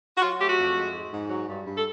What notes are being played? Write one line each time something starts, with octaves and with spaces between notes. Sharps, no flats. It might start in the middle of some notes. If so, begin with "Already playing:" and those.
F#4
F#3 F4
A3 G4
F#4
F2
G#3
G#2
G#2
F#3
G2
G2
A4